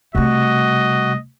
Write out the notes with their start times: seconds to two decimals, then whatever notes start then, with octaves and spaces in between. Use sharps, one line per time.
0.15 C3 G3 A3 F#4 D#5